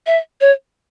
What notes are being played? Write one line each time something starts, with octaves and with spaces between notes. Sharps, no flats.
E5
C#5